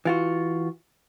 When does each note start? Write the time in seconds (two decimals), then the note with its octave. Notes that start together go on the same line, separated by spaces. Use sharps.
0.05 E3 F4 F#4